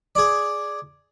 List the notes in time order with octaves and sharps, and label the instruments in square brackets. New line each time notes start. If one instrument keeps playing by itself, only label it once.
[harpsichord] G#4 D5